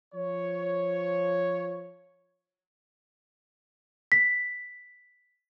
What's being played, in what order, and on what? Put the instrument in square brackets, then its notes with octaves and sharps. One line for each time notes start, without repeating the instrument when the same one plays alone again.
[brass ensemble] F3 C#5
[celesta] B6